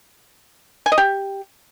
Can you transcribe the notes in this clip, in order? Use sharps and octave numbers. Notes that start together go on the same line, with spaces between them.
G#5
D#5
G4